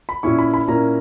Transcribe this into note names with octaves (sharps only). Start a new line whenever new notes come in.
B5
A#2 A#3 C#4 E4 C#6
B5
B5
A#2 A#3 C#4 E4 A#5